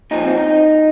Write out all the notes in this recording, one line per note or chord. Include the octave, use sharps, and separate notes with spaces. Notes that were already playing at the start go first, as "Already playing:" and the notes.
A#2 F3 D#4
C4
D#4